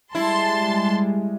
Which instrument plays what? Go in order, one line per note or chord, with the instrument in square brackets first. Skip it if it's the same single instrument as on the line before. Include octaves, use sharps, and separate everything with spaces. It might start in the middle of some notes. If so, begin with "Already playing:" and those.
[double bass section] G3 G#3 [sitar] E4 [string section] A5 C6